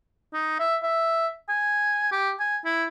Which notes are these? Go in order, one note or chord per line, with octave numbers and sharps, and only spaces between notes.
D#4
E5
E5
G#5
G4
G#5
E4